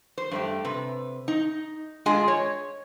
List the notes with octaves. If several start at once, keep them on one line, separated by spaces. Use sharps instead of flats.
C5
G2 A3 G4
C3 B4
D#4
G#3 D4 F4 G#4 D#5 G#5
C#5